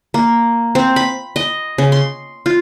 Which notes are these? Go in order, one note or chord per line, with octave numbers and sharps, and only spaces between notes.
A#3
C4
B5
D#5
C#3
C6
F4